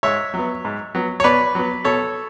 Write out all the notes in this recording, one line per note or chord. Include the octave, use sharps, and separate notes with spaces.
G#2 C#5 E5
F#3 B3
G#2
F#3 B3
C#5
B2 B4 D5
F#3 B3
B2 A4 C#5